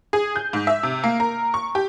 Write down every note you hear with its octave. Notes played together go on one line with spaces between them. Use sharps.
G#4
G6
G#2
E5
C3
A#3
A#4
C#6
G4